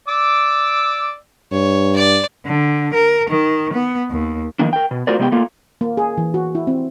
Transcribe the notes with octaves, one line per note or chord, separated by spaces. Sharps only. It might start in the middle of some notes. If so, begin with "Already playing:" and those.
D5 D6 E6
G2 C#5
D5
D3
A#4
D#3
B3
D#2
D#3 F3 A#3 D4
A#4 G5
B2
A3 F4 F#4 A#4 C5 D5
C3 G#3 B3 G4 C#5 G5
A3 A#3 F4
A#3
G#4
E3
F#4
E4
C4